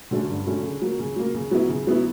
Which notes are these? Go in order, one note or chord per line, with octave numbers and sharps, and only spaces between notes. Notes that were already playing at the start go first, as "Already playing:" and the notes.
D3 F#3 A3 C#4
G2
D3 F#3 A3 C#4
C#3
F#3 A#3
C#3
F#3 A#3
C#3
F#3 B3 E4
C#3
F#3 B3 E4